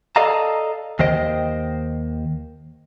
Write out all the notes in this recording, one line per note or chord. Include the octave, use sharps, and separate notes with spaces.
A4 D5 D#5 F5 A5 A#5
D#2 D#3 C5 D#5 G5